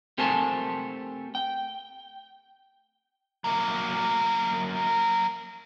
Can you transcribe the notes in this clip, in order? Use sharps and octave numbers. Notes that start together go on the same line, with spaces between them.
A3 C4 G4 A#4 G#5 A5
G5
F#3 A#3